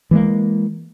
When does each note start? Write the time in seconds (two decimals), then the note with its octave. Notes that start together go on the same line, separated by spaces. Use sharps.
0.11 E3 G#3 A#3